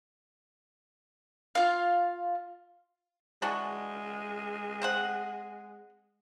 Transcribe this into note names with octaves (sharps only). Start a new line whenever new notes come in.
F4 F5
E3 G#3 D4 F#4
C4 C5 F#5